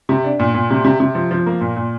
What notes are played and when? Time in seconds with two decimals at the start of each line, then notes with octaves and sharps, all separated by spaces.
0.09 C3
0.24 D4
0.39 A#2
0.54 A#2
0.70 C3
0.84 C3
1.00 C3
1.15 F3
1.31 F3
1.46 A#3
1.61 A#2
1.76 A#2